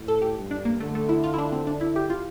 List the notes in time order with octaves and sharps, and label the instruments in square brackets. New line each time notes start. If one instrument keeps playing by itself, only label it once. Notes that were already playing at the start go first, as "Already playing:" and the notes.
Already playing: [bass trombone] A2
[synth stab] A4
G4
[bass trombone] G2
[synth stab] D4
A#3
[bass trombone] D3 [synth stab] A3
[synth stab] A3
E4
F4
E4
D4
C4
D4
E4
G4
F4